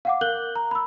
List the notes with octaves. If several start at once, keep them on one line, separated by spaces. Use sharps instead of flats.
F5 F#5 D6
A#4 F#6 G6 F#7 G7
A#5
B5 E6